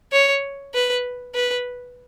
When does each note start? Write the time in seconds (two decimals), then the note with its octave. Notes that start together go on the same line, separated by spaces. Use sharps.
0.12 C#5
0.74 B4
1.35 B4